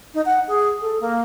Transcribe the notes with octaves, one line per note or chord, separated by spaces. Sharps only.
D#4
F#5
G#4
A4
A#3